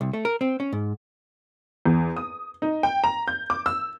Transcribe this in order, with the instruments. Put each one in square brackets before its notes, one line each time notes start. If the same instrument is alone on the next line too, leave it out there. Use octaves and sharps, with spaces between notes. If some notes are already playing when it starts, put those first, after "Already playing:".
[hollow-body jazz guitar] C2
A3
A#4
C4
C#4
G#2
[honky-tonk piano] E2
D#6
D#4
G5
A#5
G6
D6
E6